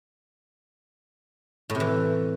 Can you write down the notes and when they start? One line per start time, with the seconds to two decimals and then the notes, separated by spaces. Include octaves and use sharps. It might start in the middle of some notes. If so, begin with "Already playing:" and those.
1.70 A2
1.75 C3
1.80 E3